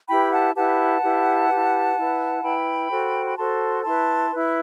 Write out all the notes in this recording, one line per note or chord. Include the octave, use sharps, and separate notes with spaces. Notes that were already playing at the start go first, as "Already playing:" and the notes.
E4 G4 B4 G5 B5
F#5 A5
E4 G4 B4 F#5 A5
E4 G4 B4
E4 G4 B4
E4 B4
E4 B4 G5 B5
F#4 A4 C5
B5
F#4 A4 C5 A5 C6
E4 B4 A5 C6
E4 B4